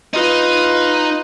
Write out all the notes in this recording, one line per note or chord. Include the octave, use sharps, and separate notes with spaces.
D#4 F4 B4